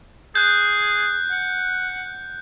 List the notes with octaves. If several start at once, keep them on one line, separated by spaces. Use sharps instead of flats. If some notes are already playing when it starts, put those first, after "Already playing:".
G#4 F#6 G6
F#5